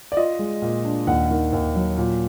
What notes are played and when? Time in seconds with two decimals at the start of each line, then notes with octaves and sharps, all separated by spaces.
0.12 D5
0.17 F4 D#5
0.39 G#3
0.62 A#2
0.84 D4
1.07 D#2 F#5
1.31 D#3
1.53 D#2
1.75 F#3
1.98 A#2